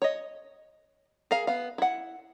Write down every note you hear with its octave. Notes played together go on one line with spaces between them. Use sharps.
C#5 D#5
G#4 A#4 F5
B3 F5
E4 F#5